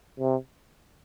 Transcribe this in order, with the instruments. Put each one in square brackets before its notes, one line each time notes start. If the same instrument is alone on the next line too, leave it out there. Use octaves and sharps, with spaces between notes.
[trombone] C3